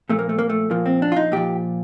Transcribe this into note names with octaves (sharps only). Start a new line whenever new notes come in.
A#2 F3 A3
A#3
A3
A#3
A3
A#2 F3 A#3
C4
D4
F4
D#4
A#2 F3 G4